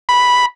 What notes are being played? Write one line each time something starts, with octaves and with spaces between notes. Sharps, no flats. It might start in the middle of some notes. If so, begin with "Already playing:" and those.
B5